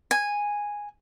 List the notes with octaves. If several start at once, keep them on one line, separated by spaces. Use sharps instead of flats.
G#5